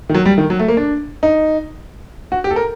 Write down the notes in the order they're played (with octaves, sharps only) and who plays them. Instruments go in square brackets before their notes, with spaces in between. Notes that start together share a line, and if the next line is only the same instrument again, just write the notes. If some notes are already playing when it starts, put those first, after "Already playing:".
[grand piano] D#3
F#3
G3
D#3
F#3
A3
A#3
D4
D#4
F#4
G4
A4
A#4